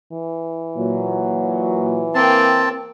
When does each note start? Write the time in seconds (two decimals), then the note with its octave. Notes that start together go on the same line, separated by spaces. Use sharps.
0.12 E3
0.76 A#2 F#3
2.15 A#3 C4 G5 A5